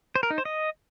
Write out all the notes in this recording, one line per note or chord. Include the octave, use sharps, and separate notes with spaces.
C5
A#4
D#4
C5
D#5